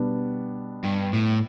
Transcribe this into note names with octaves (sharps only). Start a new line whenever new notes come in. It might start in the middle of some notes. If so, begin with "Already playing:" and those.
Already playing: B2 G3 B3 D4
G2
A2